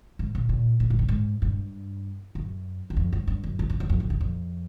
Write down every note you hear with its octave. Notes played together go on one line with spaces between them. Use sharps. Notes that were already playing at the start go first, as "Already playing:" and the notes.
G#2
A#2
A#2
A2
G#2
G2
G#2
G2
F#2
E2
F2
G2
G2
F#2
G2
F#2
E2
F2
F2
E2
F2